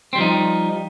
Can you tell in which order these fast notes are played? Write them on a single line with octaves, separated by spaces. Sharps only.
C4 G3 F3 D#4